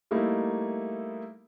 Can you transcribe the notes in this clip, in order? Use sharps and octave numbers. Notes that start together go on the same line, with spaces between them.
G3 A3 A#3 D#4 E4